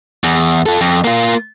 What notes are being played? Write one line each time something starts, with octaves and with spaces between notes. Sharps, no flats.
E2
F4 A4
F2
A#3 F4